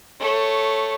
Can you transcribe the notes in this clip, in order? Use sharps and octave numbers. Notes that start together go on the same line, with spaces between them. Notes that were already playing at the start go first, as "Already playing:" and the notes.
A3 C#5